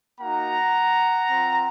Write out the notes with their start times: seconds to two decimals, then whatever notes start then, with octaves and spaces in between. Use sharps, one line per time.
0.20 A#3 D#4 F#4 F#5 A#5
1.28 C4 F4